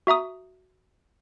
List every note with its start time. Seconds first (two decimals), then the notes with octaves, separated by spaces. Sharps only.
0.07 F#4 E5 A#5 D#6